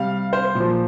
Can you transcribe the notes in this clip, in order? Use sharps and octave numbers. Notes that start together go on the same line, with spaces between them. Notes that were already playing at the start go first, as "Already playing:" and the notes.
Already playing: C3 G3 F5
C5
A#2
F3